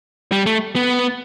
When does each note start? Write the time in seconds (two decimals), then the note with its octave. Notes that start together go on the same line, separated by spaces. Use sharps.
0.32 G3
0.46 A3
0.76 B3